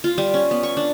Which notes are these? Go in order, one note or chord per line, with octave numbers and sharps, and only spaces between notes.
F4
G3
C#4
B3
C#6
D4